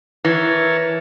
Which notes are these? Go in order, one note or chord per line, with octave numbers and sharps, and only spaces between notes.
E3 A#4 C#5 A5